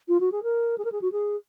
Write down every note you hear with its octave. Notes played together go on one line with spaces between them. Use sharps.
F4
F#4
G#4
A#4
G#4
A#4
G#4
F#4
G#4